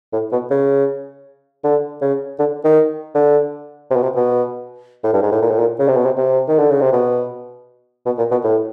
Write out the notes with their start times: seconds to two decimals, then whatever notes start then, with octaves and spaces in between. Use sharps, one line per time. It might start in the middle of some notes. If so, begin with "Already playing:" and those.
0.12 A2
0.32 B2
0.50 C#3
1.64 D3
2.01 C#3
2.39 D3
2.64 D#3
3.15 D3
3.90 C3
3.96 B2
4.03 C3
4.16 B2
5.04 A2
5.13 G2
5.23 G#2
5.32 A2
5.42 A#2
5.50 A2
5.59 A#2
5.79 C#3
5.88 C3
5.97 B2
6.05 C3
6.17 C3
6.48 D#3
6.59 D3
6.71 C#3
6.81 C3
6.93 B2
8.06 B2
8.18 A#2
8.31 B2
8.44 A2